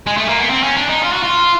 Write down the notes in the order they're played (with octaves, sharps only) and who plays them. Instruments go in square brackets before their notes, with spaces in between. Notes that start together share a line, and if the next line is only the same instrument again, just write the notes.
[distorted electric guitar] G#3
A3
A#3
B3
C4
C#4
D4
D#4
F4
F#4
F4